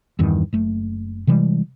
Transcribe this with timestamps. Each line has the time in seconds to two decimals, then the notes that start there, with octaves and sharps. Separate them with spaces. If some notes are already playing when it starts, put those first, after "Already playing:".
0.19 E2 G2 D#3
0.53 F#1 A3
1.27 C3 E3 G3 G#3